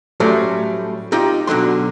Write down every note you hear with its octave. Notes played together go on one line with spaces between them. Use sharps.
A2 F#3 G3 A3 C#4 C5
C4 D#4 F4 G4 D#5
B2 D3 F#3 C6